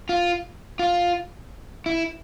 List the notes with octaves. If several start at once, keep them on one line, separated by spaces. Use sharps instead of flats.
F4
F4
E4